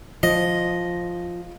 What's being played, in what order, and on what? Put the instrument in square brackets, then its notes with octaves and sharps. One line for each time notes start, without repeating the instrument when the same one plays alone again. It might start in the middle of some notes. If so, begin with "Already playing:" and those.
[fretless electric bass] F3 [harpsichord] D#5